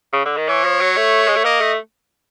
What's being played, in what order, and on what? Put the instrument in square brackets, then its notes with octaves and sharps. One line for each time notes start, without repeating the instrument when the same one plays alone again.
[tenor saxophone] C#3
D3
D#3
[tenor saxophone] E3 [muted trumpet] C#5
[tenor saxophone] F3
F#3
A3
G#3
A3
[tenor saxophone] A#3 [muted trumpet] D#5
[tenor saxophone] A3